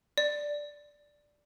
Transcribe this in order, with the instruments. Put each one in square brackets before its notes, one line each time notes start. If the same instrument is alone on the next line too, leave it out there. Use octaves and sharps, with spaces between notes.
[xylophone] D5